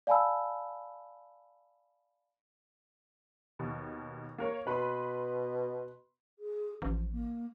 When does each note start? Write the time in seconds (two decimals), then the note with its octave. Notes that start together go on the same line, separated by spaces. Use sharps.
0.07 D5 F5 G#5 A5 B5 E6
3.59 D#2 B2
4.38 A#3 A#4 C#5
4.67 B2 B4 B5 C6
6.39 G#4
6.82 A1 F3
7.12 A#3